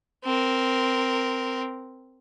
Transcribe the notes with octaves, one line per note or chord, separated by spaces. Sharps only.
C4 A#4